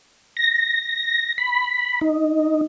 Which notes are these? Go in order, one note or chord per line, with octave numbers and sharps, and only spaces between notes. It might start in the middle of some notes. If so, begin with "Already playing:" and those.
A#6
B5
D#4